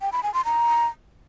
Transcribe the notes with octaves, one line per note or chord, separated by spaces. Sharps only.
G5
B5
G#5
C6
A#5